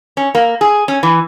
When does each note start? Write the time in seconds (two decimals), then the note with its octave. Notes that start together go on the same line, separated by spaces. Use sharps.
0.17 C#4
0.35 A#3
0.61 G#4
0.88 C#4
1.03 E3